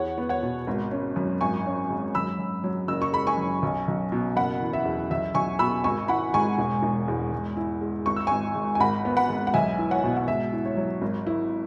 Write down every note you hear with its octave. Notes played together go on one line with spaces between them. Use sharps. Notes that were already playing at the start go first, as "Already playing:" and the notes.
Already playing: E2 C#5 F#5
B3
C#5 F#5
B2
G#1
C#4
F#2
G#1 G#5 C#6
C#4
G#2
F#2 B5 E6
F#2
F#3
F#1 E6
C#6
G#3 B5
G#5 C#6
F#2
B1
B1
B2
F#1 F#5 B5
E3
E5
E2
B1 E5
B1 G#5 C#6
B2 B5 E6
G#1 G#5 C#6
E4 F#5 B5
G#2 G#5 C#6
E1
E1
E2
G#2
E4
G#3
G#1 C#6
E6
G#1 G#5 C#6
G#2
G#5
G#1 F#5 B5
B3
F#5 B5
G#2
F#5
B1 E5 G#5
E4
C#5 F#5
B2
F#5
G#2 E5
E4
C#5
F#3
G#1
E4